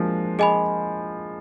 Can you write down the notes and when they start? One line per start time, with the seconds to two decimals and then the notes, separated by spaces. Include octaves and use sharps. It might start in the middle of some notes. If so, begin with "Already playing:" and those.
Already playing: F3 G#3 A#3 D4
0.39 G#4 D#5 G#5 B5